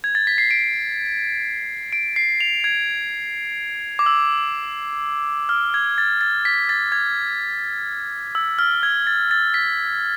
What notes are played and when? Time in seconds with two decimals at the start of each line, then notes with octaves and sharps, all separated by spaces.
0.04 G#6
0.15 A6
0.27 B6
0.38 C7
0.51 D7
1.93 D7
2.16 C7
2.41 F7
2.64 G#6
3.99 D6
4.06 E6
5.49 F6
5.74 G#6
5.98 A6
6.21 A6
6.45 B6
6.69 A6
6.92 G#6
8.35 E6
8.59 F6
8.83 G#6
9.07 A6
9.31 A6
9.54 B6